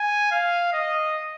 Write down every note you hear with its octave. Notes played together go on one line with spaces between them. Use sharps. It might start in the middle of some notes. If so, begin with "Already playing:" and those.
Already playing: G#5
F5
D#5